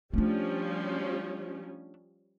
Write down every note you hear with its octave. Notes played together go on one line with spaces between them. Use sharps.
F3 G3 A3 C#4 D4